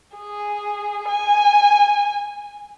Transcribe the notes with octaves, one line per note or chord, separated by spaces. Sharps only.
G#4
G#5